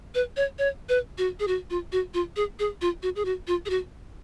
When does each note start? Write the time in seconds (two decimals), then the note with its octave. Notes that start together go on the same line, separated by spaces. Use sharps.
0.15 B4
0.37 C#5
0.59 C#5
0.89 B4
1.18 F#4
1.40 G#4
1.48 F#4
1.70 F4
1.92 F#4
2.14 F4
2.36 G#4
2.59 G#4
2.81 F4
3.03 F#4
3.16 G#4
3.25 F#4
3.47 F4
3.66 G#4
3.70 F#4